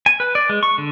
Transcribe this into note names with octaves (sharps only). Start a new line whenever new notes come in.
G#5
B4
D5
G#3
C#6
D3